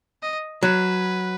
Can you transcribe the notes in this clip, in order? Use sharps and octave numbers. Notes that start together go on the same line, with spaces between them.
D#5
F#3 B4